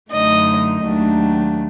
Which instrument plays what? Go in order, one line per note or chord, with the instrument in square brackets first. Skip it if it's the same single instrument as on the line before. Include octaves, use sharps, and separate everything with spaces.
[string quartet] F#2 D3 A3 D#4 D#5
D#2 D#3 F#3 A3 D4